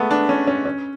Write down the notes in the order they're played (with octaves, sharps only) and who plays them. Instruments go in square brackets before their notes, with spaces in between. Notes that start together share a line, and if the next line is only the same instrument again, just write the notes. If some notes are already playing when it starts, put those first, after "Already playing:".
Already playing: [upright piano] G#3 A3 B3
D4
C#4
C#4
C#4